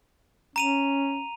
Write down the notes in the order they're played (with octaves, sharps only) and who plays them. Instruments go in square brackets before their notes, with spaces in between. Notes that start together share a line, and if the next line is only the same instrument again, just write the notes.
[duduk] C#4 [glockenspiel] A#5 D#7 F7